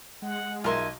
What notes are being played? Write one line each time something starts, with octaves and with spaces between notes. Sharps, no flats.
G#3 F#5
B1 D#4 F4 A#4 E5 G#5 C6